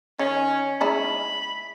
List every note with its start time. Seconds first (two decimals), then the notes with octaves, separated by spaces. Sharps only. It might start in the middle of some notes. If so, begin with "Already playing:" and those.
0.19 D#3 C#4
0.81 G#3 D#4 E4 B5